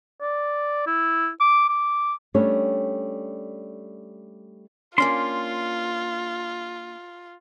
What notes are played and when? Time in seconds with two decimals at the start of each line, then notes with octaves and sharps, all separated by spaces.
0.21 D5
0.87 E4
1.40 D6
1.69 D6
2.34 G3 A3 C#4 D4 G4 C#5
4.98 A#3 C#4 D4 F4 C6